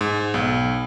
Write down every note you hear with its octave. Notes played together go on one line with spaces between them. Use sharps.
G#2
B1